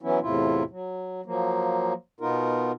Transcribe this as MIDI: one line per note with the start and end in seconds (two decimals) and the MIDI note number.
0.02 0.19 52
0.02 0.19 54
0.02 0.19 59
0.02 0.19 61
0.02 0.19 64
0.22 0.63 40
0.22 0.63 45
0.22 0.63 48
0.22 0.63 64
0.22 0.63 65
0.70 1.21 54
1.26 1.93 53
1.26 1.93 54
1.26 1.93 58
2.20 2.72 47
2.20 2.72 59
2.20 2.72 63
2.20 2.72 65
2.20 2.72 70